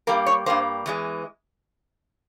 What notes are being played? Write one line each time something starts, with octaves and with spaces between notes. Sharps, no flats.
G2 G3 A#3 A#4
C#5
G2 G3 A#3 C5
E2 E3 G#3